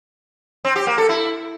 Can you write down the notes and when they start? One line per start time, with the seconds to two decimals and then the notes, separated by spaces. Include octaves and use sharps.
0.65 C4
0.76 G4
0.87 A#3
0.98 A4
1.09 E4